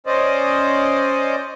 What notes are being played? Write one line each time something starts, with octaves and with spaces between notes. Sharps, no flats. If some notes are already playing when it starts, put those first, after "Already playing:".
C#4 C5 D5 D#5